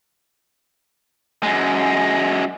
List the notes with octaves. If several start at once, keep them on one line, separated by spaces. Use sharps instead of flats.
F#2 G#3